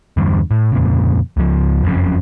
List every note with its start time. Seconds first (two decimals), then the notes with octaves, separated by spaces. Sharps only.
0.17 E2 G2 D3
0.51 A2
0.72 F2 A#2 C#3
1.37 C#2 F3
1.84 F#1 F2 A2 C#3